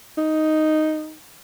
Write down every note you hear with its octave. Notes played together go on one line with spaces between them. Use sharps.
D#4